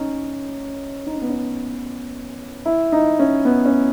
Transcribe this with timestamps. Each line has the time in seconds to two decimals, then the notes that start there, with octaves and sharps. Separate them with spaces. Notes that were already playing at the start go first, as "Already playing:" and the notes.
Already playing: C#4 D#4
1.06 D#4
1.14 C#4
1.22 B3
1.30 C#4
2.66 E4
2.92 D#4
3.19 C#4
3.45 B3
3.65 C#4